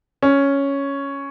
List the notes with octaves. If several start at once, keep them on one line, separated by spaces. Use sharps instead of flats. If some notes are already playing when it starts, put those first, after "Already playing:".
C#4